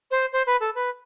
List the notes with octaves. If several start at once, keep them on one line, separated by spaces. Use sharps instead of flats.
C5
C5
B4
A4
B4